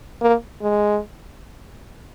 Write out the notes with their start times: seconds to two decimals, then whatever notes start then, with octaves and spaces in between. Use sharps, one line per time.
0.21 A#3
0.62 G#3